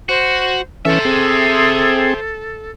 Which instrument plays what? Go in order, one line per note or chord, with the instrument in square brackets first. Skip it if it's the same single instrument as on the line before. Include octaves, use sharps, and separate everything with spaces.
[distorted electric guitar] F#4 [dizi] C5
[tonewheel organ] E3 C#4 [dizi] A4 [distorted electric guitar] C5 E5
[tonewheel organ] C4 G#4